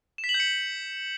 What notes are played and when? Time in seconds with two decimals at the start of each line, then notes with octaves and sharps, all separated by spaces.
0.18 E7
0.24 B6
0.29 F#7
0.34 G6
0.40 C#7